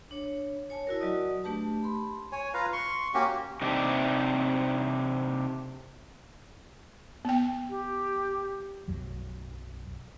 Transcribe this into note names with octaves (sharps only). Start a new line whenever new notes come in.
D4 C#5
C#5 G#5 A5
E4 F#4 A#4
F#3 F#4 D5 D#5 D#6
A3 D4 G4 B4 A5
B5 C6
C#5 G#5
F4 B4 F5 A#5
C6 C#6
A#3 C#4 F#4 G4
C3 D4 D#4 G4
B3 G5
G4
B1 F#2 F#3